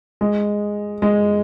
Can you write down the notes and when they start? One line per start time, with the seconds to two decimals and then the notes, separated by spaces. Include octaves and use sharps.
0.21 G#3
1.02 G#3